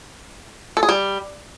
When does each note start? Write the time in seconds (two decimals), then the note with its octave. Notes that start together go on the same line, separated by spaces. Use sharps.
0.77 A4
0.83 G#4
0.89 G3